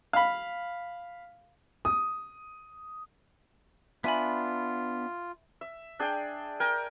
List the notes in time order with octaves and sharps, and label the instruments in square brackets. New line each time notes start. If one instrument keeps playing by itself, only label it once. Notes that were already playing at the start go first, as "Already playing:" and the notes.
[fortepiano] F5 B5
[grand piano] D#6
[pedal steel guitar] B3 D4 [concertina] F4 [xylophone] E5 G#5 B5
[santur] E5
D4 G#4 D5 G5
A#4 G5 G#5